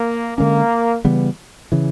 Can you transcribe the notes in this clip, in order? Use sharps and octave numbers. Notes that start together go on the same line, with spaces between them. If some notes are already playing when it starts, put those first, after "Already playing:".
Already playing: A#3
D3 F3 G#3 A#3 C#4
C#3 E3 G3 B3
C#3 E3